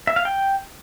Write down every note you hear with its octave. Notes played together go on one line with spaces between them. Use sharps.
E5
F5
G5